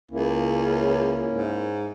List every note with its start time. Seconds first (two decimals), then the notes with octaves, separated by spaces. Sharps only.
0.11 C#2 A#3 C#4 E4
1.31 G#2